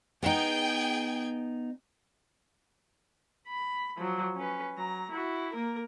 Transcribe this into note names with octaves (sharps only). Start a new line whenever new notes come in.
B3 D#4 G#4 G5 G#6
B5
F3 F#3
C#4 B4
F#3 A#5
E4 F#4
A#3 A#4